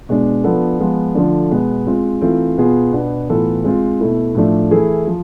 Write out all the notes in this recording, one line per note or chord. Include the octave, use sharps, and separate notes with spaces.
B2 G#3 D4
F3 B3 D4 A4
F3 G#3 B3 F4
D3 F3 A3 D4
B2 G#3 B3
G#3 C4 F4
E3 A3 C4 F4
B2 B3 F4 G#4
B2 B3 D4
A2 E3 B3 F4 A4
G#3 C4 F4
B2 A3 E4
A2 F3 A3 D4
E3 A3 E4 G#4
F3